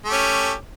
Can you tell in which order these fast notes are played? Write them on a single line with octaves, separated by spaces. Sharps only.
A3 G4 C#4